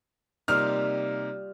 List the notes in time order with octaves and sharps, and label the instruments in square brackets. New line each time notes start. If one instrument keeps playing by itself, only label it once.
[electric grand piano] C3 A#3 D#4 [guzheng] G3 F4 F5 [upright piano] F6